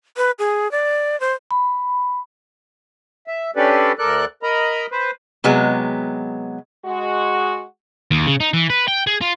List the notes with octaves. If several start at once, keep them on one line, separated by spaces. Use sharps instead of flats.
B4
G#4
D5
C5
B5
E5
C#4 D4 G4 A4 B4 D5
D2 A4 A#4 D5 F#6
A#4 D#5 A#5 B5
B4 C5
C3 F#3 G#3 B3
G#3 F#4
D#2
C#3
D#4
E3
B4
G5
G#4
F4